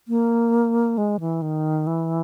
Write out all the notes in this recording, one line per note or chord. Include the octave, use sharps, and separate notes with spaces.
A#3
G#3
E3
D#3
E3